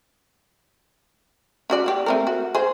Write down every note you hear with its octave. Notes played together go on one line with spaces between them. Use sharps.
C#4 F#4 D5
E4 G4
A3 C4 A#4
F#4
G#4 C5